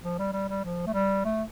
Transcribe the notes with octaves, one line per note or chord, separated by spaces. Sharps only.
F3
G3
G3
G3
F3
A3
G3
A3